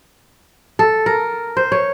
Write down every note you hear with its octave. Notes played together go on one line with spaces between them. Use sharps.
A4
A#4
C5
C#5